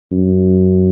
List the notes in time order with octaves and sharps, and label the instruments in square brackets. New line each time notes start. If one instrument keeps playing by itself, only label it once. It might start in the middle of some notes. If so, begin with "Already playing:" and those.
[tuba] F#2